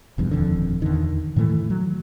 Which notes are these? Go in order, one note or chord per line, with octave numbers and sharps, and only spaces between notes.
E1 E2 G2
D#1 F2 D3
E2 D3 D#3
A2 D#3 E3 A3
F#3